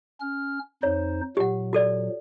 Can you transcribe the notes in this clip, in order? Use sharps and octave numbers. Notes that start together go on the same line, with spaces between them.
C#4 F6
F2 D#4 C5 C#5
A#2 F#3 G4 F#5
F#4 A4 D5